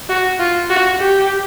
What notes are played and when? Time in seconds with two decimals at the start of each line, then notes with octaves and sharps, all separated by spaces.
0.09 F#4
0.40 F4
0.70 F#4
0.99 G4